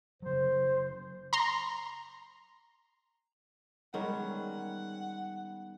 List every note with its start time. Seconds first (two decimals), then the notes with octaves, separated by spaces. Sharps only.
0.22 C#3 F#3 C5
1.33 A#5 C6
3.94 D#3 G3 G#3 B3 C#4 F#5